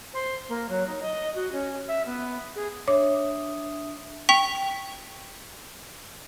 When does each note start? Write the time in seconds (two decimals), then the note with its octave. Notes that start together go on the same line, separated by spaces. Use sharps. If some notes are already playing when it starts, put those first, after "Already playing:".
0.13 C5
0.48 A#3
0.68 F#3
0.86 D#4
1.02 D#5
1.34 F#4
1.52 C#4
1.88 E5
2.05 B3
2.55 G#4
2.88 D4 C#5 E5 D6 D#6
4.29 G5 C#6 B6 F7